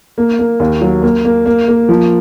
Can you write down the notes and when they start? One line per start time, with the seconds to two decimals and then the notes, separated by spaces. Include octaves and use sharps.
0.18 A#3
0.39 A#3
0.60 D#2
0.81 F#3
1.03 A#3
1.25 A#3
1.46 A#3
1.68 A#3
1.89 F3